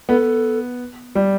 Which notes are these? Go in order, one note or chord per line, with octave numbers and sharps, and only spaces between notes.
B3 A4
G3